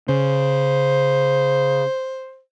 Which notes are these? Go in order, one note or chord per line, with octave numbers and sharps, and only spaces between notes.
C#3 C5